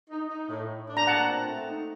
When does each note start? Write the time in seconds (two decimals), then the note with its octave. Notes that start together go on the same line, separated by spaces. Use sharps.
0.09 D#4
0.28 D#4
0.49 A2
0.68 A2
0.87 D4
0.97 A#5
1.07 A#2 F#5 A5
1.26 C4
1.46 A3
1.66 D#4